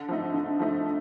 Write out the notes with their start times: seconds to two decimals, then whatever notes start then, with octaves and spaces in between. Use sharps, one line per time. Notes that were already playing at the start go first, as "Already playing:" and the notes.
Already playing: D3
0.08 F3 A3 D#4
0.34 D3
0.59 F3 A3 D#4